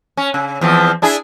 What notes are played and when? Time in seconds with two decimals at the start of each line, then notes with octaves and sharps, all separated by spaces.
0.17 C#4
0.34 C#3
0.61 E2 F3 C4
1.02 D4 E4 G#4